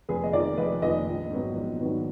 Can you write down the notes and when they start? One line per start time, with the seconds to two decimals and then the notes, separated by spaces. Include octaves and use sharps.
0.09 F1 G#4 B4
0.24 D#5
0.33 F2 D#3 A#4 D5
0.57 F1 B4 D#5
0.82 F2 D#3 B4 D#5
1.07 A#1
1.31 G#2 D#3 F#3 B3
1.56 A#1
1.80 G#2 D#3 F#3 B3